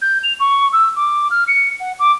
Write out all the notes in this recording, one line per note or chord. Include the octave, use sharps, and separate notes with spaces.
G6
F7
C#6
E6
D6
F6
C#7
F#5
D6